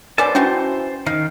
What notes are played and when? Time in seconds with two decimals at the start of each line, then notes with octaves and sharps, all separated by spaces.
0.18 B3 C#4 A#4 C5 D5 G#5 A5
0.35 E3 C#4 F#4 C6
1.06 D#3 D#4 F5